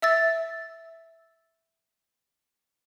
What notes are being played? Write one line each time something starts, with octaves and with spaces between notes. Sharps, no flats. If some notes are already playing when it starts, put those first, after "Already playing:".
E5 E6 A6